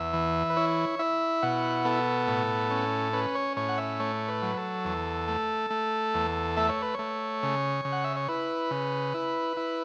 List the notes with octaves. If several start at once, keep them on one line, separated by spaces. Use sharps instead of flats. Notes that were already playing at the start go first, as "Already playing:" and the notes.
Already playing: E2 E5
E3
B4
E4 C#5
E4 E5
B2 F#5
B3 A4
A2
C#4
C#4 B4
C#5
A2 C#5
F#5
E5
A3 C#5
B4
F#3
A4
E2
A3
A3
E2
A3 E5
C#5
B4
A3 C#5
C#3
C#3
F#5
E5
C#5
E4 B4
C#3
E4
E4